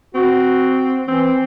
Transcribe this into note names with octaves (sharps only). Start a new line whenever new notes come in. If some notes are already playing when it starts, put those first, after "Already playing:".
C4 F#4
E3 C4